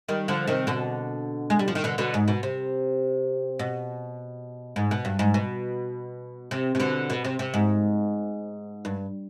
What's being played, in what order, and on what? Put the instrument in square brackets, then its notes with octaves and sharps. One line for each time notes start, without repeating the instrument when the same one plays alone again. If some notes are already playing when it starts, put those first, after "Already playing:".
[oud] D#3 G3
D3 F3
C3 D#3
B2 D3
G#3
G3
F3
D#3
B2 D3
B2 D3
G#2
B2
C3
B2
G#2
B2
G2
G#2
B2
C3
C3
B2 D3
B2
C3
C3
G#2
G2